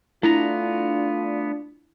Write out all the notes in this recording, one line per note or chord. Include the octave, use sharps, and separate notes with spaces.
A3 B3 D4 E4 F4 A#5